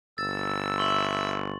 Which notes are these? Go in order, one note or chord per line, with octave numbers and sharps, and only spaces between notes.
G1 E6 A6
E5 C6 C#6 F#7